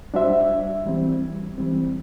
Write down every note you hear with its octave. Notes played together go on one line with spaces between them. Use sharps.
G3 D4 F#4 C5 E5
E3 G3 C4
E3 G3 C4